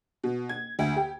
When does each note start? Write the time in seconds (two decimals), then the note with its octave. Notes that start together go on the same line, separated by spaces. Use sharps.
0.24 B2
0.49 G#6
0.79 D2
0.96 G4